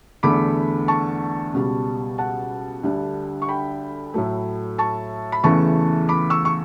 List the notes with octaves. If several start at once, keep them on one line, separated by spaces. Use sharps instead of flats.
E2 D3 A3 B5 D6
A5 C#6
C#2 B2 G3
F#5 A5
D2 D3 G3
C#6
G5 B5
A2 F#3 A3
A5 C#6
B5
E2 C#3 E3 A3 A5 C#6
B5 D6
C#6 E6
C#6